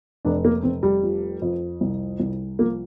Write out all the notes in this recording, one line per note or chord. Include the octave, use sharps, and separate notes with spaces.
F1 D4
A#3
F1 C4
G3
F3
F2
C2
C2
F3 A#3